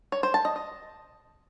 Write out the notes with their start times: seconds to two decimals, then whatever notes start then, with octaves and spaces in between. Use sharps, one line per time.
0.12 C#5
0.23 C5
0.34 A5
0.45 D#5
0.56 D#5